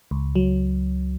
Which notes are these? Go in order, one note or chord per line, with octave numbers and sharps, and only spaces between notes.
C#2
F#3